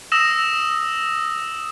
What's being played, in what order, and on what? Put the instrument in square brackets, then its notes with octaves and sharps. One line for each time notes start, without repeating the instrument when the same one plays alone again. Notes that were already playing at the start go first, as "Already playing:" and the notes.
[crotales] D#6 E6 A#6 E7